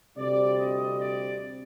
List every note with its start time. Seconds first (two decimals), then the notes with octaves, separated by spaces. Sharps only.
0.17 D2 C3 G3 C4 D5
0.59 D#5
1.00 D5